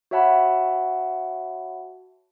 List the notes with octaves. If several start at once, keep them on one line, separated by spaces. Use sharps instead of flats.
F#4 C#5 E5 F#5 A5 B5